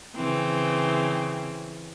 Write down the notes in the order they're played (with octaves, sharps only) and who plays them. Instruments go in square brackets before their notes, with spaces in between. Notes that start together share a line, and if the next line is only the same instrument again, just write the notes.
[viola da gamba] C#3 E3 C4